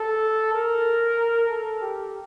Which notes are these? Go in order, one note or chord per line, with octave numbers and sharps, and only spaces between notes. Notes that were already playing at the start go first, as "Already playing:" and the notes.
Already playing: A4
A#4
A4
G4